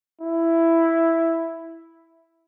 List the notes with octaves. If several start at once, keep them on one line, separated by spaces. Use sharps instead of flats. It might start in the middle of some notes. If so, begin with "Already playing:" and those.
E4